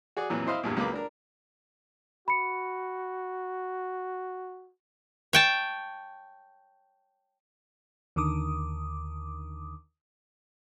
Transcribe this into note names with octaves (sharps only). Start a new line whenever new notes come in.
F#4 G#4 D5
F2 A#2 E3 F#3
E4 C5 D#5 F5 B5
E2 G2 A#2
C#2 F#3 A#3 B4 D6
D4 A#4
F#4 B5 C#7
C#5 G5 A5
D#2 D3 D#3 D6 D#6